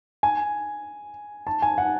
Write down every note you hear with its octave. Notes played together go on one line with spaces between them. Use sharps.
G#5
A5
G#5
F#5